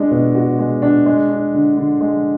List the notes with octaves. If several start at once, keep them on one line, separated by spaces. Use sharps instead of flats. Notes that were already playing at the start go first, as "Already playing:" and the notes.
Already playing: G#3 D4
B2
F#4
G#3
D4
G#3
D4
D3
D3
G#3